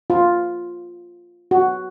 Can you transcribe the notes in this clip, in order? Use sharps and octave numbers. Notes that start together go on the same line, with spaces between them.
F4
F#4